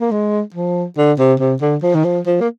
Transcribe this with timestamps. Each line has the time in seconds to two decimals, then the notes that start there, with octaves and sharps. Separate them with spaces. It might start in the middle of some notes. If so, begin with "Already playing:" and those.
0.01 A#3
0.11 G#3
0.55 F3
0.97 D3
1.19 C3
1.40 C3
1.61 D3
1.83 F3
1.95 D#3
2.05 F3
2.27 F3
2.41 A#3